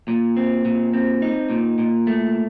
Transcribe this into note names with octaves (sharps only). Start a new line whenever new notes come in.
A#2
C4
A#2
C4
D#4
A#2
A#2
A3